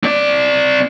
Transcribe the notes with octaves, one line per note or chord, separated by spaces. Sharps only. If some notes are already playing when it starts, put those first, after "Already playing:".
C4 D5